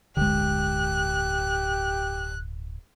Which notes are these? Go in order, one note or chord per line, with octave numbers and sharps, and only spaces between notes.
D1 G1 D3 G#3 G4 F#6